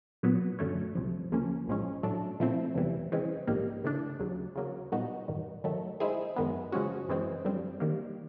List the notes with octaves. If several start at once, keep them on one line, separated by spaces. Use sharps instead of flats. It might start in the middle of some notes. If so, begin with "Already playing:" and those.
B1 A#2 F#3 B3
F#2 D3 F#3 A3 C#4
C2 C3 F3
D2 C#3 F3 A#3 C#4
A#1 A2 F3 G#3 C#4
A2 F#3 A3 D4
A#2 F3 A3 C4 E4
E2 C3 E3 G3
C#3 E3 G#3 C4
A#1 G#2 D#3 G3 A#3
C#3 E3 A3 D4
D#2 C#3 F#3
C#3 F#3 A#3
A#2 G3 B3 D#4 F#4
A1 G2 D#3
D#3 F#3 A3
D#3 G#3 C4 E4 G#4
F#2 D#3 G#3 B3
C#3 F3 G#3 C#4 F#4
F#2 C#3 E3 G#3 C4
F#2 D3 G3 C4
D#3 G3 A#3